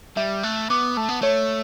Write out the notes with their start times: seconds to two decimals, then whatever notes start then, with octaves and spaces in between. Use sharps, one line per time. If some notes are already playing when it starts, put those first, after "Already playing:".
0.17 G3 E5
0.43 A3 F#6
0.70 B3 D6
0.97 A3 A5
1.09 B3
1.22 A3 C#5